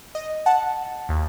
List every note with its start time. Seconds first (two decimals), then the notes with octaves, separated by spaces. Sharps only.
0.15 D#5
0.46 F#5 A5
1.09 D#2